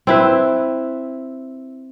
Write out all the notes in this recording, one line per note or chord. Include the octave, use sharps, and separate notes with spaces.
C4 E4 B4